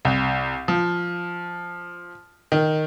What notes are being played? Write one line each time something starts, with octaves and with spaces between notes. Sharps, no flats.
C2
F3
D#3